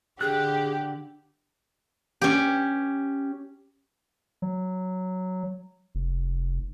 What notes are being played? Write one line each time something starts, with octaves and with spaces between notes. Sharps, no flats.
D3 G4 G#4 F#6
C#4 G4
F#3
F1